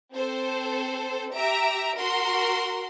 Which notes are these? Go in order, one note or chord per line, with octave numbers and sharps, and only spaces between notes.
C4 A4 C5
G4 E5 A#5 D7
F#4 A#4 C6